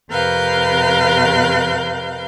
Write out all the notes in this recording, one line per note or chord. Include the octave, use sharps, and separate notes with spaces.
F2 C3 A#4 B4 F5 G6